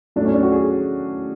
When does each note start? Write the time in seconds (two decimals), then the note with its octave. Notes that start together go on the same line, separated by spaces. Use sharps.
0.16 A2 F#3 A3 D4
0.25 C#4
0.34 D4
0.43 F#4
0.52 G#4